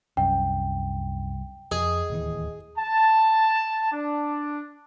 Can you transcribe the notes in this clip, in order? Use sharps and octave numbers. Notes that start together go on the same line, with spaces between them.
C2 F#2 G5
F2 G#4 D#5
D1 D#2 E3
A5
D4